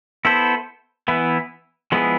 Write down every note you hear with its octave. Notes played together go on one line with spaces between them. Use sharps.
B3 E4 A4 C5
E3 B3 E4
F3 G#3 B3 E4 G#4